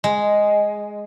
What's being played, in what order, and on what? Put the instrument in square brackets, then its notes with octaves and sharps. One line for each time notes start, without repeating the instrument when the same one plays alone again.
[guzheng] G#3